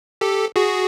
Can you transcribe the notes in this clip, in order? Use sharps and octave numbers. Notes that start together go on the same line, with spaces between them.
G4 A4
F#4 G#4